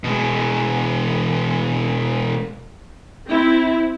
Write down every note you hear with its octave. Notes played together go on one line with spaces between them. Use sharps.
B2 G#3
C4 E4